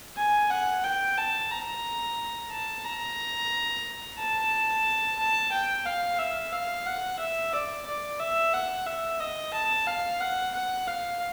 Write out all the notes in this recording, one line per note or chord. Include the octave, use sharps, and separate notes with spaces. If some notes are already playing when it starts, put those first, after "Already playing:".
G#5
F#5
G5
A5
A#5
A5
A#5
A5
A5
G5
F5
E5
F5
F#5
E5
D5
D5
E5
F#5
E5
D#5
A5
F5
F#5
F#5
F5